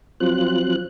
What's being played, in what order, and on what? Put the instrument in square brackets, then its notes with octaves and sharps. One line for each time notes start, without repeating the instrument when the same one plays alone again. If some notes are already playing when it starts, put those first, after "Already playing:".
[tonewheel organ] F3 F#3 C4 F4 F#6